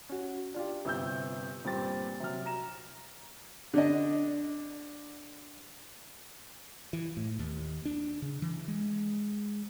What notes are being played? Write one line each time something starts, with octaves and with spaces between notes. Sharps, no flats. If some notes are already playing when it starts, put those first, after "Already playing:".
C#4 F#4
D4 F4 G4
G1 C3 E6 G6
G2 A#2 C4 G4 A6
C3 F#3 F6
A#5 E7
D3 D4 D#5
E3
A2
D#2
D4
C#3
E3
G#3